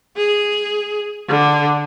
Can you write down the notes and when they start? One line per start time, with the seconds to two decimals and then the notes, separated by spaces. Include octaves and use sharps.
0.17 G#4
1.28 D3